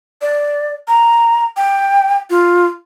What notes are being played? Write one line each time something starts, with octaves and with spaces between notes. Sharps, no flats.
D5
A#5
G5
F4